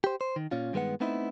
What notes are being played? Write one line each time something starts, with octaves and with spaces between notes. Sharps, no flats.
G4 C5
C5
D#3
A#2 C#4 F4
G2 D#3 G#3 B3 B4 F#5
A3 B3 C4 D#4 E4